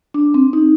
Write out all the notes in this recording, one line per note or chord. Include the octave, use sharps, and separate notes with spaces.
D4
C4
D#4